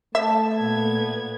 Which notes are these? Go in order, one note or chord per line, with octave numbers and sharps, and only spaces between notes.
A3 A4 E5 A5
A#2 B3 G#6